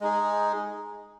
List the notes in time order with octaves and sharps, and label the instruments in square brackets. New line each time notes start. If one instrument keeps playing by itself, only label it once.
[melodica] G#3 D#4 G#4